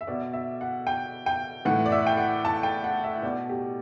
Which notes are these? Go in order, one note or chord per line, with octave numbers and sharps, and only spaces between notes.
E5
B2 D5
E5
F#5
G5
G5
A2 E3 F#5
D5
E5
G5
F#5
A5
G5
F#5
E5
B2 D5
G4